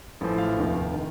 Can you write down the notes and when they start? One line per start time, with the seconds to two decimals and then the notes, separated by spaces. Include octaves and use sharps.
0.21 A1 A2 F3
0.38 F5
0.57 F1 D#2 D#3
0.94 D#3